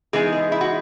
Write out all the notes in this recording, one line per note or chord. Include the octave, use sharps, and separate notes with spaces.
E3 G#3 B3 D#4 G#4
G#4
E4
F#4